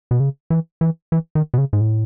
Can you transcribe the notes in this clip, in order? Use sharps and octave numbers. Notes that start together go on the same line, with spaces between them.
B2
C#3
E3
E3
E3
D#3
B2
C#3
G#2
A2